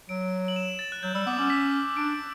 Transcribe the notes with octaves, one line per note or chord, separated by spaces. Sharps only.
F#3 D7
F#7
E7
A6
F#6
F#3 G6
G3 E6
B3 D6
C#4 D6
B6
D4 D7